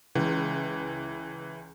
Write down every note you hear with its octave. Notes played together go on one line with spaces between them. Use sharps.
C#2 E3